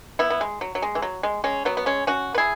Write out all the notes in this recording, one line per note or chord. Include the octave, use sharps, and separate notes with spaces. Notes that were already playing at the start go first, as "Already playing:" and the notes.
B3 E4
B3
G#3
F#3
F#3
G#3
E3
F#3
G#3
G#3 C#4
F#3 B3
B3
G#3 C#4
C#4 F#4
B4
E4 G#4